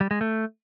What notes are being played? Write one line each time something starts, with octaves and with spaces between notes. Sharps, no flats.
G3
G#3
A3